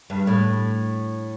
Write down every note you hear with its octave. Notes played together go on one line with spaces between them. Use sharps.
G2
A2